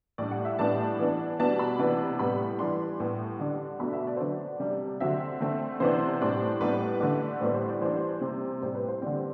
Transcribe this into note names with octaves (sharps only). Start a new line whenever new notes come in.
A2 G3 D4 D5
F#5
E5
A2 G3 B3 D4 A5
E3 B3 D4
B2 G3 B3 D4 A5
B5
C3 E3 B3 D4
A2 G3 B3 B5
E3 G3 D4 C6
A2 G3 B3
D3 G3 D4
B2 A3 D4 B5
E5
D5
C5
D3 F#3 B3 D4 D5
C3 G3 D4
D3 F#3 C4 E5
D3 A3 C4
C3 E3 B3 D4 C5
A2 G3 D4
A2 G3 B3 D4 B4
D3 A3 D4
A2 G3 B3 D4 C5
C5
D5
E3 G3 D4 C5
C3 G3 C4
A2 G3 C4 C5
B4
C5
D3 G3 C4 D5